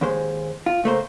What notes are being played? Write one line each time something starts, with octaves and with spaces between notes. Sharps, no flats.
D#2 G#2 G#3 C5
F4
C#2 A3 A#3 C5